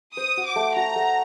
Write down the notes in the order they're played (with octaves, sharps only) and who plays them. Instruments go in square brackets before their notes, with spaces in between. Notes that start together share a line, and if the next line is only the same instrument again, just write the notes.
[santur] C5 [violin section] D#6
[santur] F#4
[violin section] D6
[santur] A3
[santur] F#4 [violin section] A#5
[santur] A3